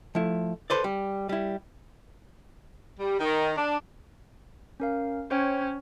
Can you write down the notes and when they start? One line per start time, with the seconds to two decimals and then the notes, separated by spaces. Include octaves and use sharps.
0.15 F3 A3 E4
0.70 A4 B4 C5 D5
0.84 G3
1.29 G3 E4
2.98 G3
3.20 D#3
3.56 D4
4.80 C#4 A#4 F5
5.31 C#4 C5 C#5 G5